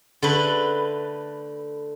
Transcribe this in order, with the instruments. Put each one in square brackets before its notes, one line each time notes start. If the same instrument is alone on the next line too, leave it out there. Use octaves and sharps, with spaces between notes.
[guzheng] D3 A3 B4